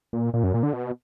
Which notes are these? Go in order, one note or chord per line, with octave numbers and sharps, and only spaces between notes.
A#2
A#2
F#2
A#2
D3
B2